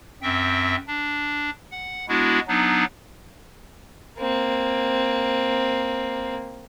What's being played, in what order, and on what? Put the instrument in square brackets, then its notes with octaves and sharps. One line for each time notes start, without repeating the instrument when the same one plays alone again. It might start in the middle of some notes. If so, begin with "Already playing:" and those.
[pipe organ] F#2 C4 E5 G5
D4
F#5
G#3 B3 D4 E4 F#4
F#3 B3 D4 D#4
[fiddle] A#3 C4